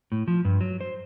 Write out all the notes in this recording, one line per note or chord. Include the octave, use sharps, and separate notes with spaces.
A2
F3
G2
F#3
C5